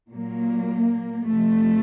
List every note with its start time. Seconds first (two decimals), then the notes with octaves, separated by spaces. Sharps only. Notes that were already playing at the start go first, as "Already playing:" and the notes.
0.10 A#2 F#3 A#3
1.25 F2 C3 F3 A3